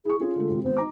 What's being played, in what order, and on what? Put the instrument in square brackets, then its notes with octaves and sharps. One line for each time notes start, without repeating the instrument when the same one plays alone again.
[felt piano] E4 C#6 [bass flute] G#4
[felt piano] C#4 G#4 [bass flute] F4
[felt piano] D3 G#3 A3
G#1 C3
[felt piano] G#1 B3 [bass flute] C5
[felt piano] D#4 A#5 D6